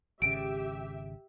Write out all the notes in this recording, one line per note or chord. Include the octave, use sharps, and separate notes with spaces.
G#1 C#3 G4 E5 D7